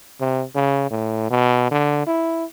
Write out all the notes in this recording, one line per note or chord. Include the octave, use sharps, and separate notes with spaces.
C3
C#3
A2
B2
D3
E4